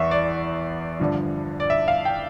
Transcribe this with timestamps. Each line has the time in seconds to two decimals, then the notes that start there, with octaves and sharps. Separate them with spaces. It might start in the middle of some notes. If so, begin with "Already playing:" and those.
Already playing: E2 E3 E5 C#6
0.11 D5
1.00 G2 D3 F3
1.60 D5
1.70 E5
1.88 F5
2.05 G5